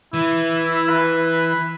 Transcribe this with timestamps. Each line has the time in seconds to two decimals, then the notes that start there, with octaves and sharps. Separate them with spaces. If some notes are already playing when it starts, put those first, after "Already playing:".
0.14 E3 E4
0.90 B4